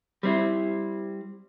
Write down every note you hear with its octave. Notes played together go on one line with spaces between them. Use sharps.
G3 C4 E4